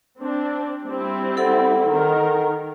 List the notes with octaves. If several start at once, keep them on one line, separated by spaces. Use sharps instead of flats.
C4 D4
G3 C4 E4
A4 F#5
D#3 A#4